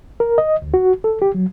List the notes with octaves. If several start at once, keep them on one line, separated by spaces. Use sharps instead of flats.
A#4
D#5
D2
F#4
A4
G4
F#3